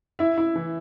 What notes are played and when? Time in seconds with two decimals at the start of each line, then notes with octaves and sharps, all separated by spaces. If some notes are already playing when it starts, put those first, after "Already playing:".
0.19 E4 E5
0.37 E4
0.56 E3